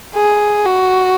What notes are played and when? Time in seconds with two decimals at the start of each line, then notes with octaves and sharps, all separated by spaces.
0.15 G#4
0.66 F#4